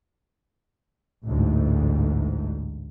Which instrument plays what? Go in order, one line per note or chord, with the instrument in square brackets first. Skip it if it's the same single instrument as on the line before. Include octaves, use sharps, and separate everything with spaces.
[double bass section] A1 D2 G#2